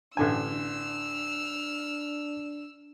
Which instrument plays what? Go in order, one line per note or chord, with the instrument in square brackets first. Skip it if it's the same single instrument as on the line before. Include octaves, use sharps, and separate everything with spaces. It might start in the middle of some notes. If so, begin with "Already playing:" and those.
[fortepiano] A1 D3 G#5 [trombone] D4 [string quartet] E6 F6